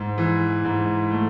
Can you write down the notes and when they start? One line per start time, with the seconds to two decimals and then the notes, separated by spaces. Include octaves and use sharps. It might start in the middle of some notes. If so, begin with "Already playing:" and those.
Already playing: G#2
0.18 E3
0.64 G#2
1.11 A3